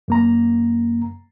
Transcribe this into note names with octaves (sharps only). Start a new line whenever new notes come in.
F#2 A#3 A#5